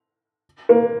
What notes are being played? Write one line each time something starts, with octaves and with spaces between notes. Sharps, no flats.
A#3